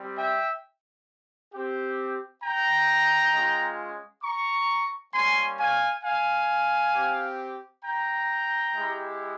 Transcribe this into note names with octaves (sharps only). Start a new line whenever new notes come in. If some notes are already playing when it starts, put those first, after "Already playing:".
Already playing: G3 C4 G4
E5 G5
C4 G4
G5 A#5
G#3 C#4 F4
A#5 C#6
G3 A#3 C#4 G#5 C6
F5 G#5
F5 G#5
C4 G4
G5 A#5
G#3 E4 G4